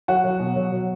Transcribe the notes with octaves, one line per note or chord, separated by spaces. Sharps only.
F#3 F#4
F#3
B2
F#3
F#3